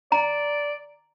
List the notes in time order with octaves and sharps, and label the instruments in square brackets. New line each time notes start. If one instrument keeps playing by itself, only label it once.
[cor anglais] D5 [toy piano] A#5